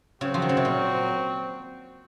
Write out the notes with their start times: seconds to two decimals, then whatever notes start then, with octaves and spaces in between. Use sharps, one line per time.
0.21 C#3 F#3 C4 F#4
0.34 F3
0.42 D#3
0.49 C#3
0.57 C3
0.65 A#2